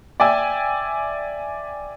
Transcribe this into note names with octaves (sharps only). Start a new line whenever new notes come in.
D5 E5 G5 G#5 E6